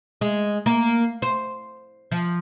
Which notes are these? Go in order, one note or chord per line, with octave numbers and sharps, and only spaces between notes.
G#3
A#3
C5
F3